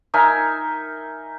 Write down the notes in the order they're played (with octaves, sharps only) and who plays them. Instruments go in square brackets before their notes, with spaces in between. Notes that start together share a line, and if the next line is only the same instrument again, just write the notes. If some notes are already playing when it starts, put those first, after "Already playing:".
[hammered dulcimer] D#4 A#4 E5 G#5